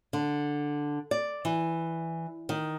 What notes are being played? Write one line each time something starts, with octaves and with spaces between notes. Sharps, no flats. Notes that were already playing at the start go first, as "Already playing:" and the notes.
D3
D5
E3
D#3